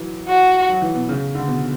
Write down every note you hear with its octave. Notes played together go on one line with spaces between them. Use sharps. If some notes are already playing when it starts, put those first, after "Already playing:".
Already playing: E3 F#3
F#4
F#3
E3
B2
C#3
D3
B2